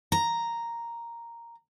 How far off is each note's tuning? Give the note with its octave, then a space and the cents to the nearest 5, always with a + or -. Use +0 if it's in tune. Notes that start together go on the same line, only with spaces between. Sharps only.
A#5 +0